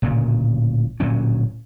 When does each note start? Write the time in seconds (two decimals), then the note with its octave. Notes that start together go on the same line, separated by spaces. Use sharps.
0.02 D1 A#2 C#3
1.00 D1 A#2 F#3 C#4